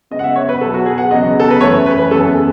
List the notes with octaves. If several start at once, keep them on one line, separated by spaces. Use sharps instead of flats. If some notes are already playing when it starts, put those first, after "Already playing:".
C#3 G#3 B3 D#5
F#5
E5
C#5
B4
B2 F#3 B3 A4
F#4
G#4
F#5
E2 C#3 F#3 B3 D#5
A4
B4
F#2 E3 A3 C#5
B4
B4
F#2 E3 G#3 B3 A4